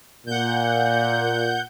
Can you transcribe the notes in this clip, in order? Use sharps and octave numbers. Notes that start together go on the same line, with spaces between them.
A#2 F#5 G6